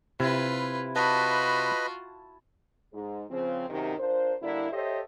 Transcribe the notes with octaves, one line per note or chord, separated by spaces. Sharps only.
C3 E4 F4 B4
F4 F#4 B4 D#5 A5 B5
G#2
C#3 F3 C4
F#2 C3 D#3
D4 F4 A#4 C5
D3 G3 A#3 D4 E4
G4 A4 C5 C#5 D#5 E5